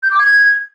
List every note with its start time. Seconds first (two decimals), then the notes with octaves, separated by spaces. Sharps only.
0.03 G6
0.11 D6
0.19 G#6